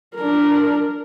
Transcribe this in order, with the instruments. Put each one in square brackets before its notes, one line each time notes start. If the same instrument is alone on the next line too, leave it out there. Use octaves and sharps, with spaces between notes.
[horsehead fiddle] D4 A#4